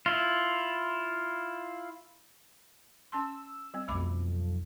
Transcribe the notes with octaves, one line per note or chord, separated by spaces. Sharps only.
E4 F4
C#4 A5 C6 E6
G3 C4
B1 F2 A3 B5 D6